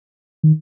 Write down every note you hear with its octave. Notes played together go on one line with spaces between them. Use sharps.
D#3